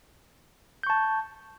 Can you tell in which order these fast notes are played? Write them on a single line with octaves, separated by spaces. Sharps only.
G6 C#6 A5